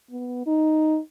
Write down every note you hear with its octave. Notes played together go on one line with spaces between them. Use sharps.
B3
D#4